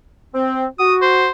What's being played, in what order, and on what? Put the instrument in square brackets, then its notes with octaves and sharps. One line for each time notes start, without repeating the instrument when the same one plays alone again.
[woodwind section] C4
[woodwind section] F#4 [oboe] D#6
[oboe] C5